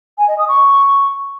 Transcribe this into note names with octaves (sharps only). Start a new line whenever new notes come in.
G#5
D#5
D#6
C#6